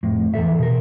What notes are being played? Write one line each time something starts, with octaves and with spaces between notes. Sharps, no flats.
F2 A2
E2 B2 A4 E5
B2 A#4